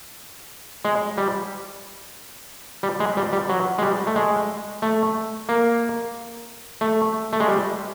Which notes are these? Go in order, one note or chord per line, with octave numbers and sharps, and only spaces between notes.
G#3
G3
G3
G#3
G3
G3
F#3
G#3
G3
A3
G#3
A3
A#3
A3
A3
G#3
G3